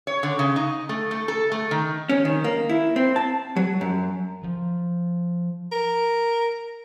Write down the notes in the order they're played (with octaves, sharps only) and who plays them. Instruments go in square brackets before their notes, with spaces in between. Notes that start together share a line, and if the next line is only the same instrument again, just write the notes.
[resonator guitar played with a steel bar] C#5
D3
C#3
D#4
A3
A3
A4
A3
D#3
[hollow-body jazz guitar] C#4
D#3
A#3
E4
C4
A5
F#3
F#2
[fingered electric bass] F3
[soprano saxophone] A#4